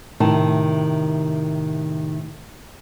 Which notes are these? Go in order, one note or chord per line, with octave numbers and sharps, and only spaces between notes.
A2 C3 D#3 A5